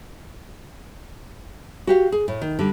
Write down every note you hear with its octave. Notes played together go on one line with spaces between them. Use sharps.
F#4 G4 F5
G#4
A2
D#3
D3 G3